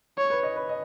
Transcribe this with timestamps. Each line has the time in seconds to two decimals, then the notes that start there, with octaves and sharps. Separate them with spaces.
0.18 C#5
0.31 B4
0.43 D#5
0.56 B4
0.69 D#5